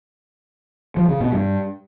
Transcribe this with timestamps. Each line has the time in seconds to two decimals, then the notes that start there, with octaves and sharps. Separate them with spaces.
0.97 F3
1.09 C#3
1.20 B2
1.32 G2